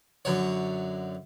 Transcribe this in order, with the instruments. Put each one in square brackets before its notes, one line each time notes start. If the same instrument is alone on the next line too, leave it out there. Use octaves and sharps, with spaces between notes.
[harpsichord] F#2 D3 C#5